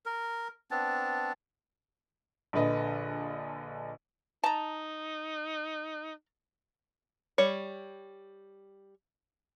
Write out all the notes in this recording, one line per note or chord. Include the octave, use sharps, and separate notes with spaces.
A#4
B3 C4 D4 A5
A#1 D3 B4 D#5
D#4 A5 A#5
G3 C#5